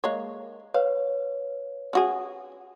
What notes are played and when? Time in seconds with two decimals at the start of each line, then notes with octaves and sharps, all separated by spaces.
0.04 G#3 A#3 C#5
0.74 B4 C#5 F5
1.93 C#4 F#4 G#4